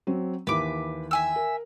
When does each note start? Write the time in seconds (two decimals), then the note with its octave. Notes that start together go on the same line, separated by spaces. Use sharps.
0.07 F#3 C4
0.47 D#2 E3 B4 D6
1.11 E5 G#5 E6
1.36 A#4